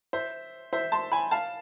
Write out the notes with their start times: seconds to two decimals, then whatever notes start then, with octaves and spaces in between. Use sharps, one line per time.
0.13 C5 E5
0.73 C5 E5
0.92 A5 C6
1.12 G#5 B5
1.31 F5 A5